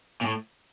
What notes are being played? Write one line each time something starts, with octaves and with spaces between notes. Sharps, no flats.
A#2
A2